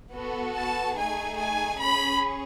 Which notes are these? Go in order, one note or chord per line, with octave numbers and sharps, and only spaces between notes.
B3 F#4 A4
A5
A3 D#4 G#4 G#5
G#5
C#4 G#4 B5